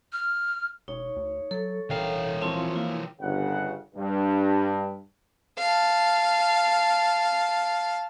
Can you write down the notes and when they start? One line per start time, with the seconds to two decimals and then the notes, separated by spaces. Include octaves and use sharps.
0.13 F6
0.88 E1 D#4 C#5
1.16 D2
1.51 F#3 A4
1.90 D#1 E3 C#4 A#4 F5 G5
2.42 F3 C4 E4 F4 C#6
2.76 A#3 E4
3.20 G1 C#3 F#5
3.95 G2
5.58 F5 A5